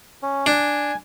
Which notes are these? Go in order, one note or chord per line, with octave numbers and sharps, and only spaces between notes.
C#4
D4 G#5